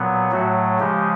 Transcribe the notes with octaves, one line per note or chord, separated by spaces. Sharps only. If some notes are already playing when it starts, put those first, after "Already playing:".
Already playing: A#2 F#3 B3
A2 F#3 A3 F#4
C#3 F3 G#3 G4